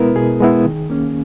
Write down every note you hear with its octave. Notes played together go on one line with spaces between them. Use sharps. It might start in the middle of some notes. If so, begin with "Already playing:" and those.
Already playing: B2 G#3 B3 E4 A#4 B4
B2 G#4
G#3 B3 E4
D#3
A#3 C#4